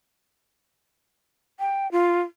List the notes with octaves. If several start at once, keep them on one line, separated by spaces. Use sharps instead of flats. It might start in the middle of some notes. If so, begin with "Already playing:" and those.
G5
F4